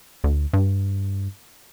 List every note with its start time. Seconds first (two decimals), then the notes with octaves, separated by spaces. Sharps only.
0.24 D2
0.53 G2